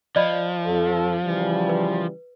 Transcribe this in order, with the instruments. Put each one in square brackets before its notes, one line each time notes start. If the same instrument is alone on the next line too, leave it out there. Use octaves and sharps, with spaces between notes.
[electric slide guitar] F3 [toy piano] D5 D#5 B5
[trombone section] F2 A4
C#3 E3 G3
[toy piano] B4